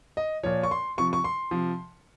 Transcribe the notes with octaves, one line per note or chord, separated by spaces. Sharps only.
D#5
A#2 F3 C#5
C#6
C6
C3 F3 C#6
C#6
C6
C3 F3